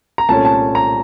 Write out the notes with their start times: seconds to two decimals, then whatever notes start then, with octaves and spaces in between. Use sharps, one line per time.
0.18 A#5
0.29 C2 A#2 A3 C#4 A5
0.45 A5
0.75 A#5